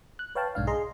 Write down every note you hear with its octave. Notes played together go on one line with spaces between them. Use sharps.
F#6
B4 C#5 F5 G5 A5
B1 G#2 D4 F5
G#4 D#5 A#5 C6